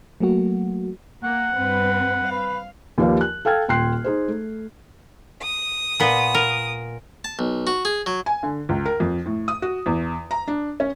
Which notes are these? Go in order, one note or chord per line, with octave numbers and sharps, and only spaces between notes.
F#3 A3 A#3 F#4
A#3 F#5
G2 C4 B4
B4 F5
D#2 F3 G4 B4 D5 F5
F#6
A4 F5 G5 F6 G#6
D#1 G5 C6 F#6 C7
D#4 G#4 C5
A3
D#6
A#2 B3
A#4
A5
B1
F#4
G#4
F#3
G#5
D3
C#2
A#4
F2
A2
D#6
F#4
E2
A#5
D4
C#4